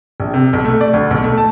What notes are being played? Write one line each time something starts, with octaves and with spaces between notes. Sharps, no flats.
A#1
C3
B1
A3
D5
D2
B1
A3
A5